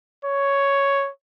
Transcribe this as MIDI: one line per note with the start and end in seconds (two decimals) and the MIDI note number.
0.25 1.10 73